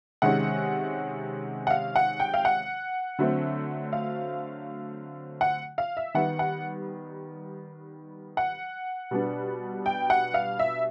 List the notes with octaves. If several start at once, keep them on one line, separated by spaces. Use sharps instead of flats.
C3 D#3 G#3 C#4 F#5
F#5
F5
F#5
G5
F5
F#5
D3 F#3 A3 C4
F5
F#5
F5
E5
D#3 G3 B3 F#5
F#5
F#5
B2 G3 B3 D4
G5
F#5
F5
E5